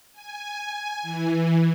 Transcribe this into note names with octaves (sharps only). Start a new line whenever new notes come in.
G#5
E3